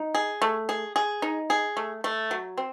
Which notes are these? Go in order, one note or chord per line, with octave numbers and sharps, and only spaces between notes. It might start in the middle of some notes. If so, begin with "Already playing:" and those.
Already playing: D#4
G#4
A3
G#4
G#4
D#4
G#4
A3
A3
F#3
C4